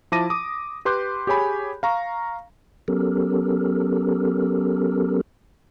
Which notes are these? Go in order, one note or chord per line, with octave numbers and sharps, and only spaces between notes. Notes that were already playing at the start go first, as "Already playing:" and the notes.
F3 E4 A5 D6 A#6 D#7
D6 D#6
G4 B4 C6 D6 F#6 G6
G4 G#4 C#5 G#5 B5
F5 A#5 C#6
F#3 B3 C#4 G4 A4 A#4